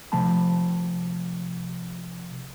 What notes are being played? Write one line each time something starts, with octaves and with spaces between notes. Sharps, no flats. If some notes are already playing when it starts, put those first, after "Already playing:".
C3 F3 A3 G5 A5 B5